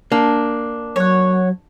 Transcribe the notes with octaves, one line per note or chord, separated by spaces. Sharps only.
A#3 D4
F#3 C#5 F#5